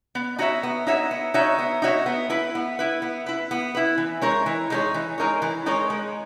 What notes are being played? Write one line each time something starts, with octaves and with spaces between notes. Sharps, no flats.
B3
D#4 F#4 C#5 E5
B3
D#4 F#4 C#5 E5
B3
D#4 F#4 C#5 E5
B3
D#4 F#4 C#5 E5
B3
E4 B4
B3
E4 B4
B3
E4 B4
B3
E4 B4
E3
G#3 D#4 A#4 C#5
E3
G#3 D#4 A#4 C#5
E3
G#3 D#4 A#4 C#5
E3
G#3 D#4 A#4 C#5
G#3